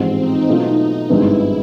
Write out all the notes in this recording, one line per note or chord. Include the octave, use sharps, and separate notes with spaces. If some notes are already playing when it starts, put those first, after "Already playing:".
Already playing: A1 G#2 F3 C4
D#4
B2 F#3 A3 D4 F4
G#1 G2 D#3 G#3 B3 E4